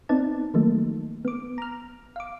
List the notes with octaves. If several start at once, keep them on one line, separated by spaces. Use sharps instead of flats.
B3 C4 D#4 D5 A5
D#3 F3 F#3 A3 A#3 D#4
B3 D6
A#5 F6
F5 D6